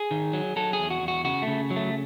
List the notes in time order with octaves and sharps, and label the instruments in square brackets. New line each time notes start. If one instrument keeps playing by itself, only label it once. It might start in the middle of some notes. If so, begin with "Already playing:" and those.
Already playing: [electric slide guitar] G#4
D#3
F#3
F#3 A4
G#4
E2
F#4
E2
F#4
C#3 F#4
A3
C#3
F#3
A3